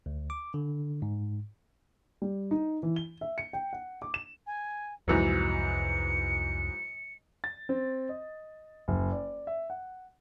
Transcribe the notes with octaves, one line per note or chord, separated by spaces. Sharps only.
D2
D6
D3
G#2
G3
D#4
E3
G7
E5
C#7
G5
F#5
D6
E7
G#5
C2 F2 G#2 E3 F#3 C#7
A6
C4
D#5
F#1
D5
E5
F#5